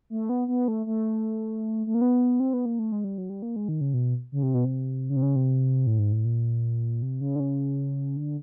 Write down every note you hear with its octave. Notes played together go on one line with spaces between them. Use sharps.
A3
B3
B3
A3
A3
A3
A#3
B3
C4
B3
A#3
A3
G#3
G3
F#3
G3
A#3
G#3
D#3
C#3
B2
C#3
C3
B2
C3
C#3
C3
C#3
C3
A2
G#2
A2
A#2
C3
C#3
D3
C#3
D3